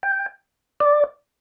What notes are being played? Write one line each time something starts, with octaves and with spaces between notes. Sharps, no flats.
G5
D5